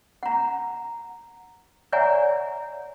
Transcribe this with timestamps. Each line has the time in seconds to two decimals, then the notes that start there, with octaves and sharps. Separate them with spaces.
0.23 F#5 A#5
1.92 C#5 D5 E5 F#5 G#5 A#5